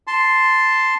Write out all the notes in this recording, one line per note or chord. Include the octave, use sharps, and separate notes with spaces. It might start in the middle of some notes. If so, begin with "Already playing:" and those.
A5 C6